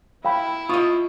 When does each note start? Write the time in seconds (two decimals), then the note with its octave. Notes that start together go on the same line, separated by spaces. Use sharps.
0.25 E4 F5 G5 B5
0.69 F4 D#5 C#6 D#6